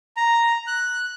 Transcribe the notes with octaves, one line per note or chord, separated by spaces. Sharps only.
A#5
F#6